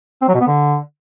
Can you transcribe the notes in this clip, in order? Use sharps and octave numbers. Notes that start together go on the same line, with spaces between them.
C4
F#3
B2
B3
D3